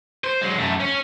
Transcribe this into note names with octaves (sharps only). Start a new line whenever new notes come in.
C5
F#3 G#3
F#2 A3
C#4